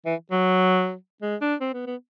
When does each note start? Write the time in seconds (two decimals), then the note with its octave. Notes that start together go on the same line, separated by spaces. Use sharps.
0.06 E3
0.31 F#3
1.22 G#3
1.41 D4
1.61 C4
1.73 B3
1.86 B3